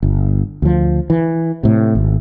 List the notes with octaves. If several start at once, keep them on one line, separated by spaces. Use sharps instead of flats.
G1
D2 F3
E3
A2 C3
G#1